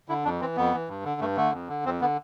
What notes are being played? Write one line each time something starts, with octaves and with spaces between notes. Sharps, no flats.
D3 E4
F2 D4
E3 C4
F2 B3
E3
G2
D3
G2 A3
D3 A3
F2
D3
F2 C4
D3 B3